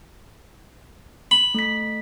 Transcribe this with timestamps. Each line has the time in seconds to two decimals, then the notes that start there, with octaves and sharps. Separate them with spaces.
1.31 B5
1.54 A3 B6